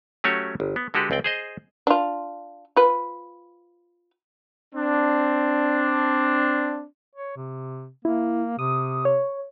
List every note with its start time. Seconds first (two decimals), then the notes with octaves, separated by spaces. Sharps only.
0.24 F#3 A3 C#4 F#4 G4 C#5
0.60 G1
0.76 B3
0.94 D3 G#3 F#4 G4 A4 B4
1.11 C#2 C4 D5 G5
1.24 G#4 C5 D#5
1.87 D4 F4
2.76 F4 B4
4.75 C4 D4
7.16 C#5
7.37 C3
8.05 A#3 E4
8.59 C3 D#6
9.05 C#5